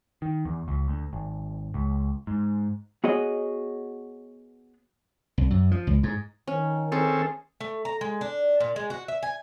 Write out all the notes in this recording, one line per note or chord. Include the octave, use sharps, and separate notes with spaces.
D#3
E2
C#2
D2
G#1
C#2
G#2
B3 F#4 G#4 C#5 D#5
C2
F#2
F3
C#2
G#2
D#3 C#4
C4 C#4 G#4 A4
A3
A#5
G#3
D4
A#2
G#3
F#4
E5
G#5